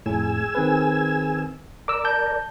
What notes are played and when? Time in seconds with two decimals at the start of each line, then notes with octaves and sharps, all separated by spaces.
0.06 F2 A2 G#4 G#5 E6
0.55 D#3 C4 B4
1.88 A#4 D5 D6 E6
2.05 A5 G6